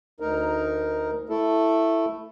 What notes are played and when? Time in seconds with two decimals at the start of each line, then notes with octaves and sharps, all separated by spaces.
0.20 D2 D#4 A#4
1.29 A3 E4 A4